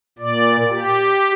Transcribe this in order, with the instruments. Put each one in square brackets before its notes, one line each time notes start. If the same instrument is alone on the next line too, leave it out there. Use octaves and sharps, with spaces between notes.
[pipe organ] A#2 D5
G4